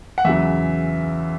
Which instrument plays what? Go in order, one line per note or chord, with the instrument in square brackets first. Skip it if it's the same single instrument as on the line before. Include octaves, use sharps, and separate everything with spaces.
[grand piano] F#5
E2 C#3 F#3 E5